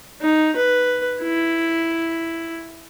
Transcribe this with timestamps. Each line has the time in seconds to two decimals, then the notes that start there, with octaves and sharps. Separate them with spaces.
0.21 D#4
0.56 B4
1.22 E4